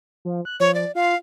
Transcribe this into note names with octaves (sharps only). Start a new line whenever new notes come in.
F3
F#6
F3 C#5
D5
F4 F5